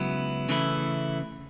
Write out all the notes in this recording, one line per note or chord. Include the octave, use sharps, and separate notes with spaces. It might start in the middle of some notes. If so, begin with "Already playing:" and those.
Already playing: C#2 C#3 F#3 B3 E4
C#3 E3 A3 E4